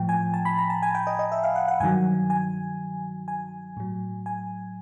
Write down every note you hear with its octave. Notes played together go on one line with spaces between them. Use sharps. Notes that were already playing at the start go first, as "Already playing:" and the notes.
Already playing: A2 F3 G5
G#5
A5
B5
A#5
A5
G#5
G5
D#5
D#5
E5
F5
F#5
F#5
G2 D#3 F#3 G#5
G#5
G#5
A2 F#3
G#5